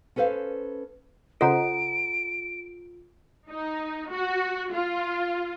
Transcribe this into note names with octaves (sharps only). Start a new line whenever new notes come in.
C#4 A4 B4 C5 F5
C#3 F4 A4 C5 D#5 F#5 A#5 D7
D#4
F#4
F4